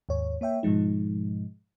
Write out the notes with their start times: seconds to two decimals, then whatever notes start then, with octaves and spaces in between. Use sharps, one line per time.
0.09 D#2 G#2 C#5
0.41 A#3 C#5 E5 G5
0.63 G#2 B2 F3 G#3 D#4